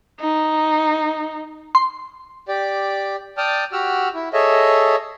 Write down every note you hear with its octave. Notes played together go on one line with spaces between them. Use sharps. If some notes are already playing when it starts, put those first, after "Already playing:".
D#4
C6
G4 D5
D5 G5 A5 D#6 F6
F#4 G4 F#5 E6 F6
E4
G#4 A4 C#5 D#5 E5